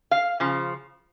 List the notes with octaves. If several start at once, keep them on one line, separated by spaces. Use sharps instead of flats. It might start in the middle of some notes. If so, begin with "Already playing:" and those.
F5
C#3 F3